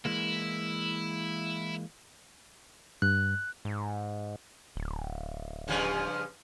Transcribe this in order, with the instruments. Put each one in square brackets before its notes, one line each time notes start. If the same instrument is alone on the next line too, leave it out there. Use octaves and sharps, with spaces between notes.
[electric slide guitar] E3 G#3 A#3 [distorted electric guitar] E4
[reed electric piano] G2 [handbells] F#6
[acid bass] G#2
D1
[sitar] G2 C#3 F3